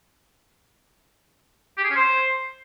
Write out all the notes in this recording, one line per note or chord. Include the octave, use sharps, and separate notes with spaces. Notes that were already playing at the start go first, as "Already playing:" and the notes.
G4
G#4
C#4
C5